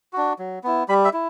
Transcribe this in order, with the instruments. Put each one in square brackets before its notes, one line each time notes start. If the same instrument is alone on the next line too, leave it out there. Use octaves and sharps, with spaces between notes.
[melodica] D4 F#4
F#3
B3 E4
G3 B5
E5
E4